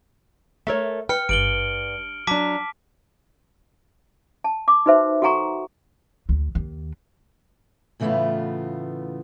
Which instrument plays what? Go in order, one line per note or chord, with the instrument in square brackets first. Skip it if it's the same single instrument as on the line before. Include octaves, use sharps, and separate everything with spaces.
[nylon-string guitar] A3 A#4 C#5 [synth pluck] E5
[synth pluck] B4 [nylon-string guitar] G5 [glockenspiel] F6 C#7
[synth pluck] G#1 [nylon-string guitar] G2 [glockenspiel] D7 F#7 G7
[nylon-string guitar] F#3 D4 [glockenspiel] A5 D6 B6
[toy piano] A5
D6
D#4 F#4 B4 C5 E5
F#4 A4 F#5 G#5 A#5 C#6
[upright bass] D2
D#2
[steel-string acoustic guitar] A2 C#3 E3 A3 B3 F4